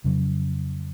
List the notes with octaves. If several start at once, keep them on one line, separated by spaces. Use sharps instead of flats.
F2 C#3 F#3